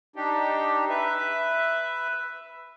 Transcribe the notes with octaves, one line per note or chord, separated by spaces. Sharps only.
D4 D#4 G4
B4 E5